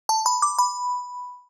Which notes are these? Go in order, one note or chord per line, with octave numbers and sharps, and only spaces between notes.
A5
B5
D6
B5